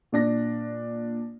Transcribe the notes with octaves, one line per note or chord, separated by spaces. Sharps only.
A#2 D4 A#6